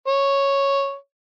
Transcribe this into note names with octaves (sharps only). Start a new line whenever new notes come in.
C#5